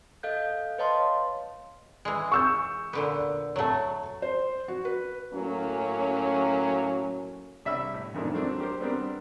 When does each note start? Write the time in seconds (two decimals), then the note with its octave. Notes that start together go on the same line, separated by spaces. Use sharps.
0.23 A4 D#5 F5 F#6 G6
0.78 B4 C#5 D#5 F5 A5 C6
2.05 E3 G#3
2.32 C#6 E6 G6
2.93 A#2 D3 B3
3.56 F#3 A3 C#5 A5
4.22 C5
4.68 F#4
4.85 B4
5.33 A2 F#3 A#3 C#4
7.65 C2 E5 B5 E6
7.94 A2
8.14 F2 G#2 D#3 A3 D4 E4
8.34 F#3 A3 A#3 C4 D4
8.60 G4 A#4 C5
8.81 G3 B3 C4 D4 A#4